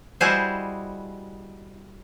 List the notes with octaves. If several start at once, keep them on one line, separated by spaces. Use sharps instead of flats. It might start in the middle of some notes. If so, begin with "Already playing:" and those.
G3 E4 F#4 G#4 C5 D#5